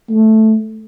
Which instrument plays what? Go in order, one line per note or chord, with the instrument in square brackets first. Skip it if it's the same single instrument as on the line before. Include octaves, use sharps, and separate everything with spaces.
[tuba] A3